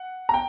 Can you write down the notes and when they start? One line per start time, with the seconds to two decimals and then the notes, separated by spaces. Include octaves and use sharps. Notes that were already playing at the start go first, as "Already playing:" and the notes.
Already playing: F#5
0.29 A#5
0.34 G5